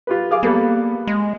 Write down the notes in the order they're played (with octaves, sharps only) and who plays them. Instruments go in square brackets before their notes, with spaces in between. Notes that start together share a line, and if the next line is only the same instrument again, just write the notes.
[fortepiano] F4 G4 B4
G#4 F5 D6
[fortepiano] G3 B3 A4 [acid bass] A#3
[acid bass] G#3